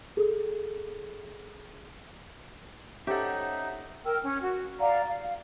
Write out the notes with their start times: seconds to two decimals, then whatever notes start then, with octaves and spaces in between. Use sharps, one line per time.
0.17 G#4 A4
3.07 C#4 D#4 G4 A4 C5 C#5 E5 F#5
4.06 A#4 G5 E6 F6
4.23 C#4
4.42 F#4
4.80 D5 F5 F#5 A#5
5.09 F5